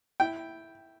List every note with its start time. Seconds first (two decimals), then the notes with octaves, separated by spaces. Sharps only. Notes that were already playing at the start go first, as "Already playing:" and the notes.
0.20 E4 G5